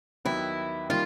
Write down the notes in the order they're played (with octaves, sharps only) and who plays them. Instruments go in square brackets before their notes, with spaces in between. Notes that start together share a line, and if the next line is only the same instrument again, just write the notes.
[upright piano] D#2 D#3 F#3 B3 [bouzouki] E4
[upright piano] D#3 G3 A#3 [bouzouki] F4